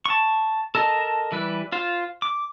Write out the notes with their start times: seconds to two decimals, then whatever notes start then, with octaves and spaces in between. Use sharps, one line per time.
0.06 A5 C#6
0.75 A4 A#4 D#5 A5
1.32 E3 G3 B4
1.72 F4 C5
2.22 D6